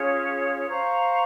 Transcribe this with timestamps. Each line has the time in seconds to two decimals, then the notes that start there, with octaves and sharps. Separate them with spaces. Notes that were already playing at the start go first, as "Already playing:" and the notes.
Already playing: C#4 F4 G#4 C#5
0.69 C5 F5 A#5 C#6